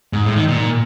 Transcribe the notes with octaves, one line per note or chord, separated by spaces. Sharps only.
G#2
A2
D#3
A#2